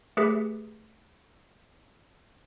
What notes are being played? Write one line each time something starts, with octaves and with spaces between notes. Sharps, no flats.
A3 G4 G#4 B4 B6 C7